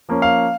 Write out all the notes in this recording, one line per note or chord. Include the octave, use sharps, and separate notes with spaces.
F3 A#3 C#4
F5